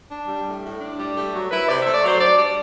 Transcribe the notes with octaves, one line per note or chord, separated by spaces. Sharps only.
D4
G3
A2
A2
D4
G3
A3 G4
F#3
E4 B4
C3 D5
A3 E5
D5
F#3 C5
D4 D5
G3 D5